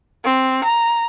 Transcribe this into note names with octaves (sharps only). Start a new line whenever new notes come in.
C4
A#5